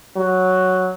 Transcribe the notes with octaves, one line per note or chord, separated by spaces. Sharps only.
F#3